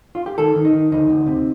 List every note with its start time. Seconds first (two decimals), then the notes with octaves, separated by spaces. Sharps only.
0.15 F4
0.26 G4
0.38 D#3 A4
0.56 D#3
0.65 D#4
0.73 D#3
0.92 D2 D#4
1.10 D2
1.26 C3